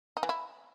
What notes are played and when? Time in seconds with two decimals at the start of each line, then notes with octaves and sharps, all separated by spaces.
0.17 D#4
0.23 E3
0.29 E4